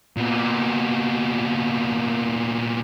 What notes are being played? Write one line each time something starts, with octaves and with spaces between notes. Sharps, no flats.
A#2 B3